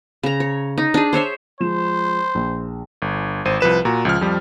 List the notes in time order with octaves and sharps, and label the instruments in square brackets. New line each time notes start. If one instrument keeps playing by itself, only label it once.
[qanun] C#3 A#5
C#5
D#4
D4 G#4
C5 C#5 E5 C6
[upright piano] F3 G#3 E7 [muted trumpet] C5
[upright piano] A#1
[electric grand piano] G1
G#1 C5 D#7
C2 F3 B4 E7
A#2 F#4 A#5
C#2 F3 F6
F2 F3 G3